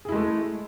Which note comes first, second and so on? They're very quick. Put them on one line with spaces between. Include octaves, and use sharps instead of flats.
G#4 E4 G#3 A3